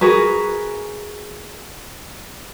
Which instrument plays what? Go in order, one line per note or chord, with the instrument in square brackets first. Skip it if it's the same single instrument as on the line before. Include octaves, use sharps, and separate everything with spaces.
[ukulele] F#4 G#4 A#4 B4